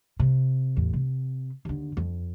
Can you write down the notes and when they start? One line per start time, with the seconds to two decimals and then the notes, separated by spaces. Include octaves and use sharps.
0.19 C3
0.77 A1 E2
0.93 C3
1.65 D#2 D3
1.97 F2